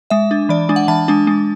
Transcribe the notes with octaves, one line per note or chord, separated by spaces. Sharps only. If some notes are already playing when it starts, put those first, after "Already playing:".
G#3 E5
D4
E3 D5
G#3 D4
F#5
E3 A5
G#3 D4
G#3